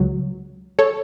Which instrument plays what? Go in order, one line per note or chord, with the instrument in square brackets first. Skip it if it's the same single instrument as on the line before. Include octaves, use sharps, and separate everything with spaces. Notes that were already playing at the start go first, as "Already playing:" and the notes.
Already playing: [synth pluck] C#2 C#3 F#3
A4 C#5